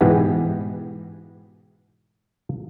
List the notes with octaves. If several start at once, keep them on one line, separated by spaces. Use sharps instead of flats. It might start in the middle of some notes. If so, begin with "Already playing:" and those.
G#2 B2 E3 B3 G4 G#4